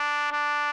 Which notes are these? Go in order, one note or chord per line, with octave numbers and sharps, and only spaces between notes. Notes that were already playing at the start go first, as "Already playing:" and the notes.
Already playing: D4
D4